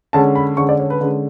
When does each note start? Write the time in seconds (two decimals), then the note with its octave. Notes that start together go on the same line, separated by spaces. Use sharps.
0.13 D3 G#3 C#4 A5
0.35 B5
0.57 D3 G#3 C#4 C#6
0.69 D5
0.80 C#5
0.90 B4
1.01 D3 G#3 C#4